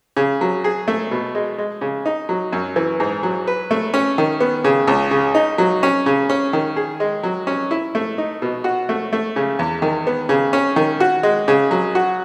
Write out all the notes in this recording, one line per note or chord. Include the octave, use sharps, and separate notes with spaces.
C#3
F#3
G#4
A3
B2
G#3
G#3
C#3
D#4
F#3
F#2
E3
G#2
F#3
B4
A3
C#4
D#3
B3
C#3
C#2
C#3
D#4
F#3
C#4
C#3
C#4
D#3
G#4
G#3
F#3
C#4
E4
A3
D#4
B2
F#4
A3
A3
C#3
E2
D#3
B3
C#3
C#4
D#3
F#4
G#3
C#3
F#3
F#4